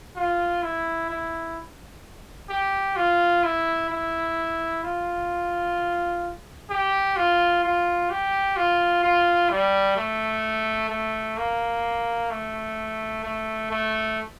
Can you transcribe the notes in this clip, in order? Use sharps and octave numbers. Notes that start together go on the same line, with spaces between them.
F4
E4
E4
G4
F4
E4
E4
F4
G4
F4
F4
G4
F4
F4
G3
A3
A3
A#3
A3
A3
A3